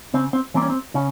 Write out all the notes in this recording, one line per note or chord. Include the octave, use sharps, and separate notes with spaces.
C#3 C4
C4
E3 G3 A#3 C4
C#4
C4
C#3 C#4